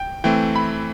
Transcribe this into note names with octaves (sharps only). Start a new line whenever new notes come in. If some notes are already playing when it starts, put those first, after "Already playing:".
Already playing: G5
E3 A3 C4 G5
B5